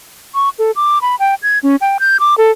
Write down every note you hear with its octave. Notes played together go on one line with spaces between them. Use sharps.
C#6
A4
D6
B5
G5
G#6
C#4
G5
G6
D6
A4